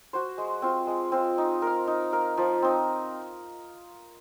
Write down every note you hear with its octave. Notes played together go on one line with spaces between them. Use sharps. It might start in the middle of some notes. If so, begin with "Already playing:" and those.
F#4 C5
G#3
C4 F4
G#3
C4 F4
D#4
A#4 F5
D#4
A#4 F5
F3
C4 D#4